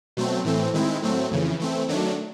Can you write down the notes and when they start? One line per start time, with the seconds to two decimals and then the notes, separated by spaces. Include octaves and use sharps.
0.17 B2 F#3 A3 C4
0.45 A2 E3 A3 C4
0.74 D#3 G#3 C4 E4
1.02 A2 F#3 A3 C4
1.31 F2 C#3 E3
1.60 E3 A3 C4
1.89 D#3 F#3 A3 D4